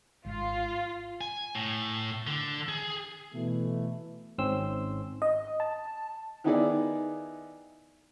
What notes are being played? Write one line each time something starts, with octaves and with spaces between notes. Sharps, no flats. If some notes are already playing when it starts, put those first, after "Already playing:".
G#1 G#2 F4
G#5
A2
D3
G#4
B2 E3 A3
G#1 G#2 C4 C#4 C6 E6
D#5
A5
D#3 B3 D#4 E4 G#4 D5